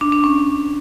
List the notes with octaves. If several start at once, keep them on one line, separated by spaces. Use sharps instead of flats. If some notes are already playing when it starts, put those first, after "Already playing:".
D4
D4
C#4